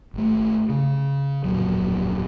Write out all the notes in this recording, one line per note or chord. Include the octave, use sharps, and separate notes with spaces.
G#1 A3
C#3
D1 F2 A#2 F#3